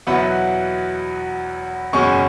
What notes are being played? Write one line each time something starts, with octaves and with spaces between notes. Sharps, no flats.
E2 B2 F#3 B3 E4 F#5 B5
F#1 E2 B2 G#3 C#4 G#5 C#6